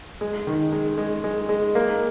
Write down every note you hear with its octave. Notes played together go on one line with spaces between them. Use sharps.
G#3
D#3
G#3
G#3
G#3
G#3
A#3